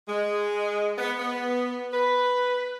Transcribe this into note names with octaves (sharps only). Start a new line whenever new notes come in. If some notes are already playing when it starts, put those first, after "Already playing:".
G#3
B3
B3
B4